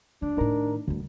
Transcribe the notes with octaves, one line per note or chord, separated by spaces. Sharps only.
D2 D4
A2 D#3 D#4 A#4 A#5
D2 D3 G3